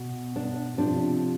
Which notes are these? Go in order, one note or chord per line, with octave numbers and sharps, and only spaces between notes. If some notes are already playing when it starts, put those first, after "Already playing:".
Already playing: B2
D4
C3 F3 D4